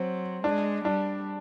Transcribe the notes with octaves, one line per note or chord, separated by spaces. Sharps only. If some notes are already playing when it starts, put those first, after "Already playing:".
Already playing: F#3 C4
G#3 D4
G3 D4